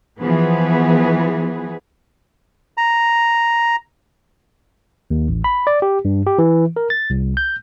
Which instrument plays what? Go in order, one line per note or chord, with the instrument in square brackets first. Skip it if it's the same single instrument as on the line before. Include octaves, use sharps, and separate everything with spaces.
[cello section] E3 F3 B3 G#4 B4
[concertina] A#5
[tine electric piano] D#2
A1
B5
D5
G4
G2
G4
E3
A#4
A6
C2
G6